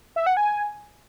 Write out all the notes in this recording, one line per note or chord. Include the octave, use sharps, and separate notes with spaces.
E5
F#5
G#5